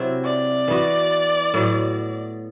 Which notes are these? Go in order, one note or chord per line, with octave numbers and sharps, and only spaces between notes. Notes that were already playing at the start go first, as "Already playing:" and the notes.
Already playing: C3 F#3 C4 E4
D5
E3 B3 F#4
A2 F#3 B3